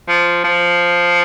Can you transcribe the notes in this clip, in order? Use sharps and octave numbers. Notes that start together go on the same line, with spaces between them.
F3
F3